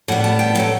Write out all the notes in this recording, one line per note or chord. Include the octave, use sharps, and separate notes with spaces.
A2 G3 B3 F#5
A5
G5
A2 F#3 A3 A4